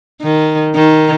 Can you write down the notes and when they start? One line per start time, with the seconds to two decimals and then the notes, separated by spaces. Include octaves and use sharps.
0.23 D#3
0.75 D#3